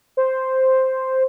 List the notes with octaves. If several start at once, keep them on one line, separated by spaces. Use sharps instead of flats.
C5